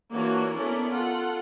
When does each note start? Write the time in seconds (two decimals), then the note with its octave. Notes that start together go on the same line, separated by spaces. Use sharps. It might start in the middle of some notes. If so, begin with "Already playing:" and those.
0.13 E3 A#3 D4 F4 F#4 C#5
0.54 B3 C#4 E4 A4 A#4 D5
0.92 F4 A4 F#5